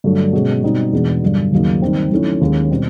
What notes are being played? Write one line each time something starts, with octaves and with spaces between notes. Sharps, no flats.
G2 D3 F#3 A3 D4
B2 G#3 C#4
B2 G3 C4 D#4
E2 B2 G#3 B3 D4
G2 D3 F#3
D#2 C#3 F#3 A#3 D#4
D#3 G3 C4
D#3 F#3 A3 C#4 E4
D#2 D#3 G#3 C#4
B2 G3 C4